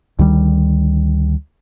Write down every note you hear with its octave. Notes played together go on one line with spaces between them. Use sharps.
D2 D#3 G3